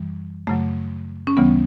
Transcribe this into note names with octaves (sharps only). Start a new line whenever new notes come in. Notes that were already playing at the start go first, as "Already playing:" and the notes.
Already playing: F#2 E3 G3
F#2 C#3 F#3 A3
C#4
D2 C#3 E3 G3 B3